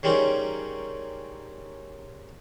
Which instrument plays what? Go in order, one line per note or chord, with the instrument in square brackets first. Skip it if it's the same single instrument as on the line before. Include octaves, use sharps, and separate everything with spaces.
[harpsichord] C#3 G3 A#3 C4 C#4 D#4